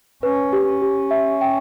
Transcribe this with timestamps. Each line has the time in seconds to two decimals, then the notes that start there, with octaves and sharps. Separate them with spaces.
0.23 C#4 B4
0.53 G4
0.68 C#4
0.82 G4
1.11 E5
1.41 G5